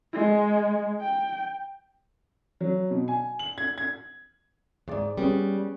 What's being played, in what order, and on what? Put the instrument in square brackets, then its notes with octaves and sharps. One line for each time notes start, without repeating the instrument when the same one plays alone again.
[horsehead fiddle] G#3
G5
[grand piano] F#3
B2
G#5
F#7
G#6
G#6
[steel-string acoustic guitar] F2 G#2 [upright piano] G#4 D5
[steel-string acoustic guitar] G3 [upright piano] B3 C#4 G#4